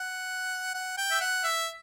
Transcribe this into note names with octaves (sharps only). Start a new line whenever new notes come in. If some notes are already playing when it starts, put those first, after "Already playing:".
Already playing: F#5
F#5
G5
E5
F#5
E5